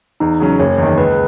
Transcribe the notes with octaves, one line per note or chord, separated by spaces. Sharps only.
E2 D#4
C#3 F#3 C#4
F#1 C#5
E2 D#3
C#2 B4